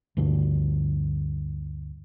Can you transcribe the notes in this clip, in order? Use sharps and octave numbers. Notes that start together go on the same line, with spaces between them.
D2 G2 D3